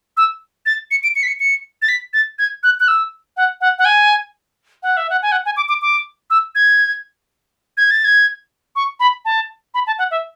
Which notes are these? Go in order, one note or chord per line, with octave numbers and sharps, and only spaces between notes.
E6
A6
C#7
D7
C#7
B6
C#7
C#7
A6
B6
A6
G#6
F#6
F#6
E6
F#5
F#5
F#5
G#5
F#5
E5
F#5
G#5
F#5
G#5
D6
D6
D6
E6
G#6
G#6
A6
G#6
C#6
B5
A5
B5
A5
F#5
E5